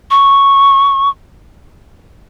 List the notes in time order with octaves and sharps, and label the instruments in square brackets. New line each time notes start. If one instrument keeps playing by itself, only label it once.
[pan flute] C#6